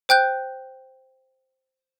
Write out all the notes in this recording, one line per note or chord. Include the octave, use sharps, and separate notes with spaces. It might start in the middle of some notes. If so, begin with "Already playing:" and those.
C5 G5 F#6 G6